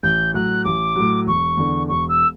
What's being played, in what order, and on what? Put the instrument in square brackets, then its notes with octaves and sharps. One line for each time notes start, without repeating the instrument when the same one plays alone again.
[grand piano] A1 [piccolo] G6
[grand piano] A2 F#3 [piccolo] F#6
[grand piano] A1 [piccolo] D6
[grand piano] A2 F#3
[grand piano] E1 [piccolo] C#6
[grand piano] E2 D3
[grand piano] E1 [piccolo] C#6
[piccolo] E6